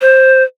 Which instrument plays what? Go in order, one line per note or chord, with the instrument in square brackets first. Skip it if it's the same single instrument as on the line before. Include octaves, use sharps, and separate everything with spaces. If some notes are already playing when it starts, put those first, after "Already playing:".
[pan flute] C5